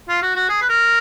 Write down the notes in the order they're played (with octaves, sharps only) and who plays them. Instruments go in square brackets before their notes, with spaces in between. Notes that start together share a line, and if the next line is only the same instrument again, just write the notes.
[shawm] F4
F#4
F#4
G#4
B4
A#4